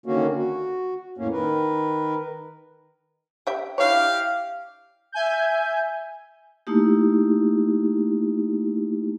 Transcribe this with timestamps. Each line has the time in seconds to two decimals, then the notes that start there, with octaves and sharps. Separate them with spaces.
0.06 D3 D#3 A#3 C#4 F#4
0.36 F#4
1.18 F2 A2 A#3 C#4
1.32 D#3 A#4 B4
3.47 G4 E5 G5
3.78 D4 E4 G4 C#5 F5
5.12 E5 G#5 G6
6.67 A3 A#3 D#4 E4 G4